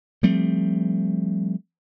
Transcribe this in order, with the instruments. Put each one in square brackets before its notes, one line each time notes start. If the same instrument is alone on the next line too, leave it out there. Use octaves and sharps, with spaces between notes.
[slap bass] F3 G3 A3 C4